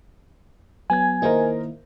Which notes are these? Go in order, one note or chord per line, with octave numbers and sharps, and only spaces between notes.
F#3 B3 G#5 G#6
D#3 A#3 E4 A#4 C5 D#5